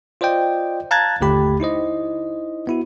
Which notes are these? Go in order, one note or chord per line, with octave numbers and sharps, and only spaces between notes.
F4 C5 D5 D#5 G5
F5 A5 A#5 F#6 G#6 A6
G1 D#2 D3 A3 G4 B5
D#4 E4 C5 D#5
B3 E4 F#4